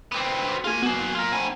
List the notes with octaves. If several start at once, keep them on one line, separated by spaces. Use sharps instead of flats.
B3 C4 D6
F#4 D6
A#3 F4 G#4 G#5 A#6
F#3 A#3 B3 F#4 G#4
F4 A#4
C4 F#5 G#5 A#5 B5